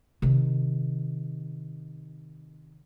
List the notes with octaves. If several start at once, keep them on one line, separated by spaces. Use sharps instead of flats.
C3 D#3